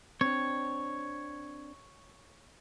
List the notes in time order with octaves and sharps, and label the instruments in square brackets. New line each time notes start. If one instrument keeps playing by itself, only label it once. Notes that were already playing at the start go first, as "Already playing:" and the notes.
[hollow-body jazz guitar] C4 D4 [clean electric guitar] C#5